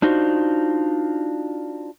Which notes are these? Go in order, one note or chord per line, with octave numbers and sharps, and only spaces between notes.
D4 D#4 F4 F#4 C5